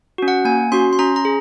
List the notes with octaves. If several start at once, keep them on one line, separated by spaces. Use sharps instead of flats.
C#4 F#4
F#5
A#3 G#5
C#4 F#4 C6
C6
C#4 A#5
A#5
G#4